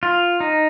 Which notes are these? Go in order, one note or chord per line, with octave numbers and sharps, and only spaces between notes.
F4
D#4